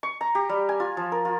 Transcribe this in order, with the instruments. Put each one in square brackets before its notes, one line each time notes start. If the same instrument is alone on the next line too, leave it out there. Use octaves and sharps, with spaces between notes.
[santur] C#6
A#5
G4
G3
G#5
F4
F3
A#4
F4